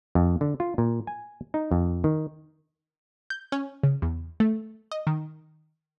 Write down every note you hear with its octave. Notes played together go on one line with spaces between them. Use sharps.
F2
D3
F4
A#2
G#5
D#4
F2
D#3
G6
C#4
C#3
E2
A3
D#5
D#3